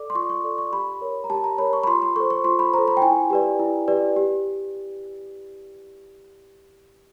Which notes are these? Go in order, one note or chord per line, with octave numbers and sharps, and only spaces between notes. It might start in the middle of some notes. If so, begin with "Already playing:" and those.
Already playing: A4 D5 D6
C6
F4 C#6
C#6
A4 D5
C#6
G4 B5
A#4 C#5
A#5
G4 A5
A#5
A#4 C#5 B5
C#6
B5
F4 C6
C6
A4 C5 C#6
C#6
F4 C6
B5
A4 C5 A#5
B5
G5
E4 G#5
G4 B4 D5
E4
G4 B4 D5
G4